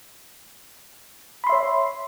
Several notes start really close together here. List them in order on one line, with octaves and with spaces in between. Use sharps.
B5 C6 E5 C#5